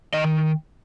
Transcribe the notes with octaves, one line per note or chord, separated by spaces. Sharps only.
D#3 D#5